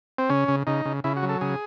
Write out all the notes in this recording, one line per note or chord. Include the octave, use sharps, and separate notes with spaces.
C4
C#3 C#4
C#3
C#3 D#4
C#3
C#3 E4
F#4
F#3
A4
C#3 G#4